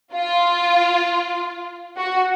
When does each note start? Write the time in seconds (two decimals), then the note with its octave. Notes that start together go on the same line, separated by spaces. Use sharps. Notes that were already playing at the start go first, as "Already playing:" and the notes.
0.14 F4
1.97 F#4